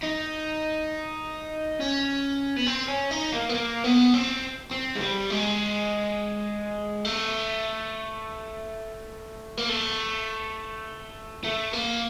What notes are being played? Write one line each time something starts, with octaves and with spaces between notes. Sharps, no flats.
D#4
C#4
B3
C4
C#4
D#4
A#3
B3
A#3
B3
C4
C4
G#3
G3
G#3
A3
A#3
A3
A3
A#3